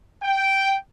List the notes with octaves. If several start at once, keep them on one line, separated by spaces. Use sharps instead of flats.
G5